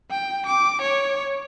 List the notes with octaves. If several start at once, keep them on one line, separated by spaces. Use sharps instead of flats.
G5
D6
C#5